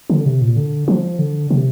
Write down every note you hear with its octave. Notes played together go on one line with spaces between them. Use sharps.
D3
C3
A#2
D3
F3
D3
C3